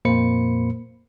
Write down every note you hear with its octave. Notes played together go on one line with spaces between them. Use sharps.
F2 A#2 A#3 C5 B5 C#7